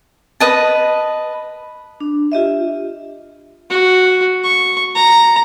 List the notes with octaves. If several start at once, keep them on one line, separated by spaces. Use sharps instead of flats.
B4 D#5 A5
D4
F4 G4 D#5 E5
F#4
C#6
A#5